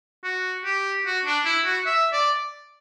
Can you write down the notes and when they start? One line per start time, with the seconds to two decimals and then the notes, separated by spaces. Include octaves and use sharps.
0.24 F#4
0.64 G4
1.05 F#4
1.25 D4
1.45 E4
1.65 F#4
1.86 E5
2.13 D5